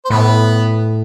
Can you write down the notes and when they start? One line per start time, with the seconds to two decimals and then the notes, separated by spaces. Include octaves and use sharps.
0.05 C5
0.10 A2 B3 B4